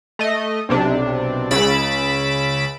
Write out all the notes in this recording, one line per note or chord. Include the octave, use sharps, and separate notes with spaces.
A3 D#5
B1 C3 D4
C#2 C#3 B5 E6 A6 D7